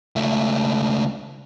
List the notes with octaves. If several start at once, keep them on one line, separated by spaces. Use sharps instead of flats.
C#2 A3